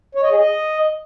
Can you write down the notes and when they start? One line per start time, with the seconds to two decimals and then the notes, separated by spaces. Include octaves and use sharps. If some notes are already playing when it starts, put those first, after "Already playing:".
0.15 C#5
0.23 D#5
0.30 G#4
0.38 D#5